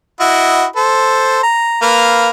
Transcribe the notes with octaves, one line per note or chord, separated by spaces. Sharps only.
E4 F#4 D#5
A4 C5
A#5
A#3 B4 F5